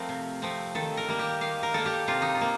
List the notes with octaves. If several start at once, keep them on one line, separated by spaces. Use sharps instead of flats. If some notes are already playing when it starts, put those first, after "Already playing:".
Already playing: F3 A3 C4 A#4
C3
F3 A3 C4
D#3 A4
A#4
G3 A#3
G4
D#3 F5
A#4
G3 A#3 A4
G4
C3 F4
D#4
F4
A#3